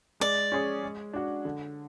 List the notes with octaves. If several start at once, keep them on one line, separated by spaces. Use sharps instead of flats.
G#3 D5
C#4 G#4 C#5
G#3
D4 F#4
D3